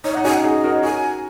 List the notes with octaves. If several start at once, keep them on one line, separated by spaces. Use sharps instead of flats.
D#4 C#5
F#5
D#4
C#4 F#4 G#5
F#5
D#4 G#4 D#5
F#4 A#4
C#5
F#4 A#4 G#5